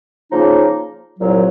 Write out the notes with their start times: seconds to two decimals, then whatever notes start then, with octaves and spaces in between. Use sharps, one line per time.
0.31 C#3 F3 A#3 D#4
1.18 C2 A#2 F#3